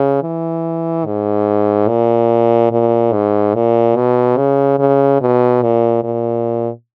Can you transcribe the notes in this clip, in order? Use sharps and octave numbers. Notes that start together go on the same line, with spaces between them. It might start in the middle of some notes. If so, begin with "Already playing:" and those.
Already playing: C#3
E3
G#2
A#2
A#2
G#2
A#2
B2
C#3
C#3
B2
A#2
A#2